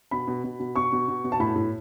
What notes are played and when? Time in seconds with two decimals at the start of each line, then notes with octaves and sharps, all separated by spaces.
0.11 B2 B5
0.27 B2
0.44 B2
0.60 B2
0.76 B2 C#6
0.92 B2
1.08 B2
1.24 B2
1.32 A5
1.40 A2 B5
1.56 A2